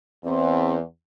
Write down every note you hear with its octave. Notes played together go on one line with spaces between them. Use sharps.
E2 C4